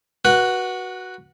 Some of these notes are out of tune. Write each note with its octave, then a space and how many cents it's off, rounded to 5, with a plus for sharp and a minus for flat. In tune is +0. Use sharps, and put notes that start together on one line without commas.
F#4 +0 B4 -25 F#5 +0